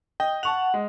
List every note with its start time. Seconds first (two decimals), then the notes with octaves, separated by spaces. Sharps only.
0.20 D#5 G5
0.43 F#5 A5 C#6 F7
0.74 G#3